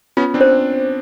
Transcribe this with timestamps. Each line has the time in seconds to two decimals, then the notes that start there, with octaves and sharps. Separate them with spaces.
0.17 B3 C#4 F4
0.34 C4 D4
0.41 C5